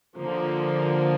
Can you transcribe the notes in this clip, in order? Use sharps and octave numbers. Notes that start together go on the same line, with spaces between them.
D3 F3 A#3